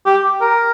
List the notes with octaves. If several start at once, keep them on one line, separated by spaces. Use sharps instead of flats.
G4
A#4